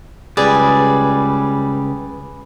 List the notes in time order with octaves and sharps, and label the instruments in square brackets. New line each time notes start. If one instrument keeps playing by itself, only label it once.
[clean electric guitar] C#2 G3 [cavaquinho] G#4 B4 D5